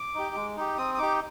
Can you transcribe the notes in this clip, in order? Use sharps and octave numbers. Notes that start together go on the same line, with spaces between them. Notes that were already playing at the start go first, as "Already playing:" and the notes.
Already playing: D6
D#4 G4
G#3
D#4 G4
C4 D#6
D#6
D#4 G4 D6